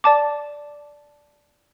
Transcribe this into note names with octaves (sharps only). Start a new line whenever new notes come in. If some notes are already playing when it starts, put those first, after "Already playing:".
D5 A5 D6